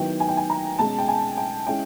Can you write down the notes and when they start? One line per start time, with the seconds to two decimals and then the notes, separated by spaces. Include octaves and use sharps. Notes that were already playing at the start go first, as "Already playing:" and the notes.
Already playing: D#3 F#3 B3 E4 G5
0.20 G#5
0.29 G5
0.37 G#5
0.50 A#5
0.79 B2 G#3 C#4 A5
0.98 G5
1.08 G#5
1.37 G5
1.67 G#3 C#4 E4 G5